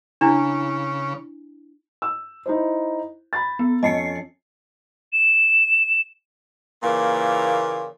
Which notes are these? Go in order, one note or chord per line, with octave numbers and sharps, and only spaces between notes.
C#3 D4 E4
E6
D#4 E4 C5
B5 A6
B3
F2 C#4 D#5 A5 C7 C#7
E7
A#2 C#3 E3 A#3